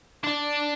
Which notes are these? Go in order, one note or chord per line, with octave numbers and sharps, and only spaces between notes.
D4